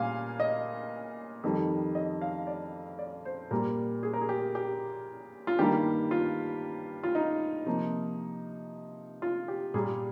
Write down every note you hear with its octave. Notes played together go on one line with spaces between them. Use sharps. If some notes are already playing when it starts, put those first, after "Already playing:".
Already playing: A#2 G3 A#3 F5 G#5
D#5
F2 D#3 G3
D#5
F5
D5
D5
C5
A#2 G3 A#3 A#4
G#4
A#4
G#4
G4
G4
F4
G2 D#3 G3 A#3 G4
F4
F4
D#4
C3 F3 A#3
F4
G4
A#2 G3 A#3 G#4